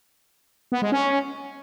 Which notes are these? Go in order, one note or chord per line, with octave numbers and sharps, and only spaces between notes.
B3
G#3
C#4